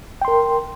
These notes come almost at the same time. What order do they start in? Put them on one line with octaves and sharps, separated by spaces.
G5 C6 A#4